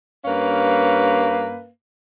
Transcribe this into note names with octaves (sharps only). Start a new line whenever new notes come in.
G2 A#3 C#4 B4 F5